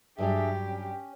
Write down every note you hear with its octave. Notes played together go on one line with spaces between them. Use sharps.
G2 F#3 D4 G4 G#4 D5 E5
C#4